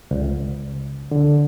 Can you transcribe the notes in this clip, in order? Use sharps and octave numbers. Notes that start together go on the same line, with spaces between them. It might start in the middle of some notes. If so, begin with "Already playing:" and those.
C#2
D3